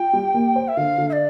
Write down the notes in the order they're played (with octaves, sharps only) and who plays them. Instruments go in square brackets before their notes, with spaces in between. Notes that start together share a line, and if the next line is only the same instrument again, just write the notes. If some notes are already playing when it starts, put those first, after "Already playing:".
Already playing: [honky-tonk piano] F4 [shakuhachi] G5
[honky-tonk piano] G3
A#3
C5
[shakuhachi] E5
[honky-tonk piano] D3 [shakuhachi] F5
[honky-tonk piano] D3
[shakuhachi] E5
D5